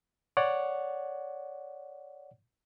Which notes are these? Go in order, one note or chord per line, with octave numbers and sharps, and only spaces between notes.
C#5 D5 F#5